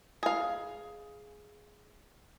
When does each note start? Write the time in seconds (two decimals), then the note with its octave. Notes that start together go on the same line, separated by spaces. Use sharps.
0.23 G#4 F5